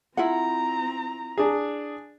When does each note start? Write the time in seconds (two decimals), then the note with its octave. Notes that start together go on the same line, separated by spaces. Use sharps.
0.17 C4 E4 F4 F#5 A#5
1.38 D4 G#4